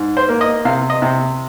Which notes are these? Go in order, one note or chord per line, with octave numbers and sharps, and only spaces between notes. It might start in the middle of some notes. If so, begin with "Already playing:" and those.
Already playing: G#2
C5
A#3
D#5
C3 F5
D#5
C3